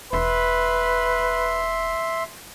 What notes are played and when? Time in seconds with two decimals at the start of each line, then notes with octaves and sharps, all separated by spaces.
0.13 E1 B4 E5 C6